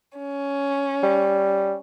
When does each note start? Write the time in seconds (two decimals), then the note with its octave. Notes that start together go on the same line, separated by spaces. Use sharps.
0.17 C#4
1.03 G3